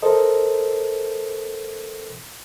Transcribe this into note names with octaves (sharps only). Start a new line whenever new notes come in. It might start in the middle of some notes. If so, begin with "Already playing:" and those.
A4 A#4 C5 D#5